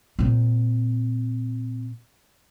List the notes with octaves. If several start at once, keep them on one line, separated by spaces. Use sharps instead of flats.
A#2 C4